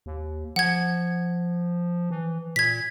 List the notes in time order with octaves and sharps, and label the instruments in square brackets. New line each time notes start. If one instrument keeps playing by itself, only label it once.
[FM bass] D#2
[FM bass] F3 [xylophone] F#5 G#6
[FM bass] E3
[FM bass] A#2 [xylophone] G#6 B6